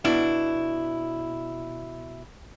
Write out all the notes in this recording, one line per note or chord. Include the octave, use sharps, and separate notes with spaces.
B2 D4 E4